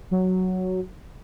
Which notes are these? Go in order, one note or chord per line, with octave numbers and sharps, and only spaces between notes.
F#3